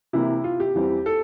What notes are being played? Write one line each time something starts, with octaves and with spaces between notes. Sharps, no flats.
C3 E3 A#3 E4
F4
G4
E2 E3 G3 C4
A4